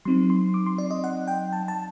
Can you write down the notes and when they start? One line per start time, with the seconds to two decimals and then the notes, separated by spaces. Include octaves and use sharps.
0.05 F#3 C4 D#4 C6
0.30 C6
0.54 D6
0.66 C6
0.78 D5
0.91 D#5
1.04 F#5
1.28 G5
1.53 A5
1.68 A5